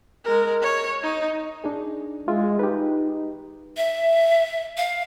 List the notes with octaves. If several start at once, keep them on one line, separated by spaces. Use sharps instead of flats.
G#3 A#4
C#5
D#4
D4 D#4 G#4
G#3 F4 E5
D#4 G4 B4
E5
F5